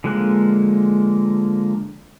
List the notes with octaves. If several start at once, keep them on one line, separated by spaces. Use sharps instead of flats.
D3 F3 G#3 A#3 F#6